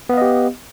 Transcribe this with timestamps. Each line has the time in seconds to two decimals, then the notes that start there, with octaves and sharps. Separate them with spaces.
0.09 B3
0.14 F5
0.18 D#5
0.22 G4